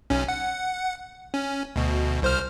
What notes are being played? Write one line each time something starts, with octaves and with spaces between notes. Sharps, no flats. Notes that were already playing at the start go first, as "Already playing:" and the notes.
B1 C#4
F#5
C#4
D2 B2
C2 C5 F6